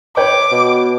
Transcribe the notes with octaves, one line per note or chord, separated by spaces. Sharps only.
B4 C#5 G5 D6
B2